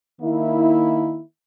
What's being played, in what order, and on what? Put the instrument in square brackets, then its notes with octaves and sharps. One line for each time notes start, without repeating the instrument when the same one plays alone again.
[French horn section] D#3 A#3 E4